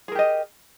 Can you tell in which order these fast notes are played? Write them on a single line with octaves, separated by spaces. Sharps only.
G#4 A#4 G4 D#5